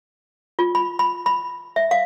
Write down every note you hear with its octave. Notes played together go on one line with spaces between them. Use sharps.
F4
B5
B5
B5
E5
F5